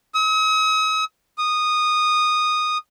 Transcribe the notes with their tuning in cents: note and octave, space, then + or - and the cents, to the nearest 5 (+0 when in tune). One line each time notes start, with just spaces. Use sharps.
D#6 +45
D#6 -15